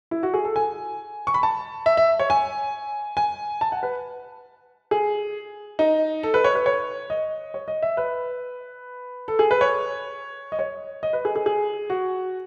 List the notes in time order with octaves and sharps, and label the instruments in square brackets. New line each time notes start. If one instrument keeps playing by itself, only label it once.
[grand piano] E4
F#4
G#4
A4
G#5
C#6
B5
A5
E5
E5
C#5
G#5
G#5
A5
F#5
B4
G#4
D#4
A4
B4
C#5
B4
C#5
D#5
C#5
D#5
E5
B4
A4
G#4
B4
C#5
D#5
C#5
D#5
B4
G#4
G#4
G#4
F#4